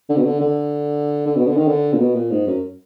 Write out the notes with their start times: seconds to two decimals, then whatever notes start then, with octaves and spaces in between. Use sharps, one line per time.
0.10 D3
0.17 B2
0.25 D3
0.41 D3
1.27 D3
1.36 B2
1.47 D3
1.57 D#3
1.68 D3
1.94 A#2
1.99 B2
2.15 A#2
2.31 G#2
2.47 F#2